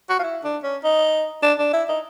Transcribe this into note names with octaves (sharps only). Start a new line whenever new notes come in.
F#4
F4
E4
D4
C#4
D#4
D4
D4
E4
D#4